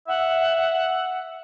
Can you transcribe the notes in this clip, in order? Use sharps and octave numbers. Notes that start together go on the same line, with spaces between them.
E5 F#5